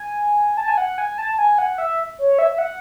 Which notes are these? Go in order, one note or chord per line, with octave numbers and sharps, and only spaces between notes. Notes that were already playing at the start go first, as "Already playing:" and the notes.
Already playing: G#5
A5
G#5
F#5
G#5
A5
A5
G#5
F#5
E5
C#5
E5
E5
F#5